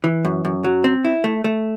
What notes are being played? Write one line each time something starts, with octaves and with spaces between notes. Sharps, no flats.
E3
F#2
F#2
F#3
C4
E4
A3
A3